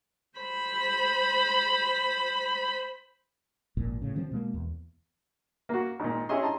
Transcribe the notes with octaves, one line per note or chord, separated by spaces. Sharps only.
C5 B5
G#1 F2 A#2
A2 C#3
D#3 F3 F#3 C4
B2 G#3 A#3
E2
A#3 F#4
G#1 A#2
C#4 E4 G4 G#4 D#5 C6
D#5 A5 A#5 C6